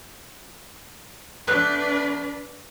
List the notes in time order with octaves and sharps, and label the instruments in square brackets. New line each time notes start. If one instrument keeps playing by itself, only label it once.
[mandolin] A3 B3 F#6 [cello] D4 B4